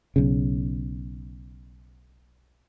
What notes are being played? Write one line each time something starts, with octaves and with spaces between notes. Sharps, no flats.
B1 C#3